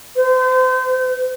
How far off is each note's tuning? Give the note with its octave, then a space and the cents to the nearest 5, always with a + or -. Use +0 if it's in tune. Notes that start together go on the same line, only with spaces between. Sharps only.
C5 -35